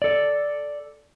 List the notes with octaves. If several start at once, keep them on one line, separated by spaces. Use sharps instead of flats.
A4 D5